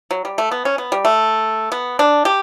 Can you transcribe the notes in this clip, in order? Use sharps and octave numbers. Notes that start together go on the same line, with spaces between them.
F#3
G3
A3
B3
C#4
B3
G3
A3
B3
D4
G4